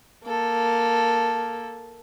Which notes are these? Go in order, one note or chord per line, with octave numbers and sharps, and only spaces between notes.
A#3 A4